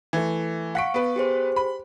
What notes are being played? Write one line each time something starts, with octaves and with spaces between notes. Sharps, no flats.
E3 A3
F5 F#5 C#6 B6 D7
B3 B4
G4 G#4 C5
B5